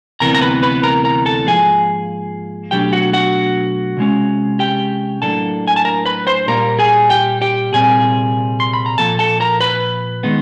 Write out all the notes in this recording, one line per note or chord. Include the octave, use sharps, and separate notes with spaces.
D2 C3 E3 G3 B3 A#4 A#5
A#5
B4 B5
B4 B5
A#4 A#5
A#4 A#5
A4 A5
G#2 F3 A#3 G#4 G#5
B2 F#3 A3 D4 G4 G5
F#4 F#5
F#4 F#5
C3 E3 G#3 C#4
G4 G5
A2 F#3 A#3 D4 A4 A5
G#5
A5
A#4 A#5
B4 B5
C5 C6
A#2 G3 A#3 A#4 A#5
G#4 G#5
G4 G5
G4 G5
C2 A#2 G3 C4 G#4 G#5
C6
B5
A#5
A#2 F3 A#3 A4 A5
A4 A5
A#4 A#5
B4 B5
D#3 G#3 B3 D#4